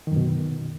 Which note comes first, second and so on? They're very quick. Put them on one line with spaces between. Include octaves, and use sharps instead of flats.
D#3 F#2 B2